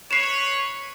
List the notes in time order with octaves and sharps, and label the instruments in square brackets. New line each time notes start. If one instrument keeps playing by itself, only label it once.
[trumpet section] B4 C#5 [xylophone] C7 E7